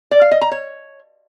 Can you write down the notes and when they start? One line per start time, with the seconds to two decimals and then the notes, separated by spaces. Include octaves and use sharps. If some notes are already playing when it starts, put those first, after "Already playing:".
0.11 D5
0.21 F5
0.31 D#5
0.41 A#5
0.51 C#5